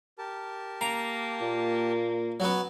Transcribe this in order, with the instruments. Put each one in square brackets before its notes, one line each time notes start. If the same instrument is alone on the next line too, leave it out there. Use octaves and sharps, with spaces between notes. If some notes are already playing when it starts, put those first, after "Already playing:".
[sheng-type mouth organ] G4 A#4 A5
[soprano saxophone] A#3 [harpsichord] A#5
[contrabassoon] A#2
[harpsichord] F#3 B3